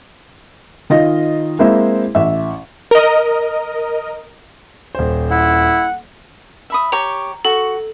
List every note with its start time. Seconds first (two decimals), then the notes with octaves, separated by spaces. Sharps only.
0.90 D#3 F4 D#5 A#6
1.59 G#3 A#3 C4 E4 C5 E5
2.15 A1 E5
2.91 A#4 D#5
4.95 D#1 C5
5.31 E4 F#5
6.70 E5 B5 D#6
6.92 G4 C#5 A#5 C#6
7.45 F#4 A4 C#6